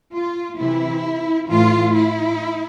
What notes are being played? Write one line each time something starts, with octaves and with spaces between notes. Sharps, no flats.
F4
C3 E3 E4
A2 E3 F4
E4